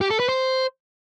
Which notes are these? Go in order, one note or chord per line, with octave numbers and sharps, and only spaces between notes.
G4
A4
B4
C5